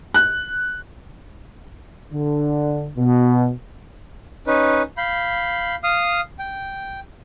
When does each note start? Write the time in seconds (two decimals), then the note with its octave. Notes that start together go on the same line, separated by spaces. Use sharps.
0.14 F#6
2.11 D3
2.97 B2
4.47 C#4 D#4 B4
4.98 F5 B5 G6
5.84 F5 D#6 F6
6.39 G5